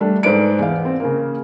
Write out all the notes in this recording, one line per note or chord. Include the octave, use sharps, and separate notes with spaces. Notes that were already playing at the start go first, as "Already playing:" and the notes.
G3 A3 D4
G#2 A4 B4 C5 D5 D7
E2 F5
C4
C#3 A#3